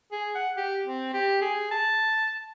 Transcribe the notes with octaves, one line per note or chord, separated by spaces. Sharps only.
G#4
F#5
G4
C4
G4
G#4
A5